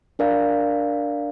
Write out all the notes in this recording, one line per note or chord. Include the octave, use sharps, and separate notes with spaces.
D4 A#4 D5 F5